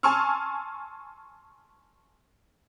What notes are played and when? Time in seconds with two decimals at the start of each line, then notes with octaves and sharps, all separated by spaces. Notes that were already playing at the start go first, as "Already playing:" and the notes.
0.03 G#5 A5 C6 C#6 E6 F6